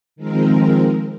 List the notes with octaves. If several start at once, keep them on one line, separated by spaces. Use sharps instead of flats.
D#3 F3 G#3 C4 A#4